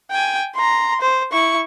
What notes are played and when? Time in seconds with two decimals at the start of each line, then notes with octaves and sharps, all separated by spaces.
0.11 G5 G#5
0.55 A#5 C6
1.01 C5
1.32 E4 C#6